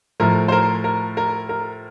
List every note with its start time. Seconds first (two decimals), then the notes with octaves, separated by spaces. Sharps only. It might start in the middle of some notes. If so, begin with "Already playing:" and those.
0.20 A2 F3 A#4
0.48 C5
0.52 A#4
0.84 A#4
1.17 A#4
1.49 A#4